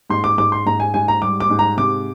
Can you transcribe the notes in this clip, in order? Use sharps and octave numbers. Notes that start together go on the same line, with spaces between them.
G#2 C6
D6
G#2 D6
C6
G#2 A#5
G#5
G#2 G#5
A#5
G3 D6
D6
G#2
A#5
C3 D6